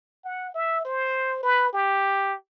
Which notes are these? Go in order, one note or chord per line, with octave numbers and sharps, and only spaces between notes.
F#5
E5
C5
B4
G4